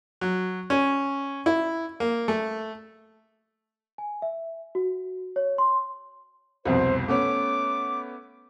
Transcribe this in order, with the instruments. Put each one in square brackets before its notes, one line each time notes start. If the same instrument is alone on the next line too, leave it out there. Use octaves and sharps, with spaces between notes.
[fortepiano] F#3
C#4
E4
A#3
A3
[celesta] G#5
E5
F#4
C#5
C6
[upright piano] C2 F2 B2 [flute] C5
[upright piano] A3 B3 C#4 [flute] D6